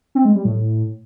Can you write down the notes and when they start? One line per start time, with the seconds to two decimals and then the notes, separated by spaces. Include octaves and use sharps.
0.15 C4
0.25 G#3
0.35 G3
0.45 A2